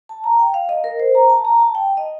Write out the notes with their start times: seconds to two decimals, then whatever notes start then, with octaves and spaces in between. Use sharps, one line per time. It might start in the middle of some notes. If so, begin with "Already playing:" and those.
0.09 A5
0.24 A#5
0.39 G5
0.54 F5
0.69 D#5
0.84 A#4
1.00 C5
1.15 A#5
1.30 A5
1.45 A#5
1.60 A5
1.75 G5
1.97 D#5